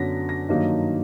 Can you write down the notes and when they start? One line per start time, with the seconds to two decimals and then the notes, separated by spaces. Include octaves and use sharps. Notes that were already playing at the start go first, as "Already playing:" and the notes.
Already playing: F#2 D3 F#3 B3 A#6 B6
0.29 A#6
0.49 G2 D#3 F#3 A#3 D#4